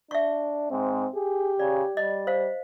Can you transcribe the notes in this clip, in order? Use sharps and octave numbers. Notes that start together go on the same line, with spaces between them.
D4 E5 C#6
G#2 C4
G4 G#4
C#3 D5
G3 D#5
C5 F5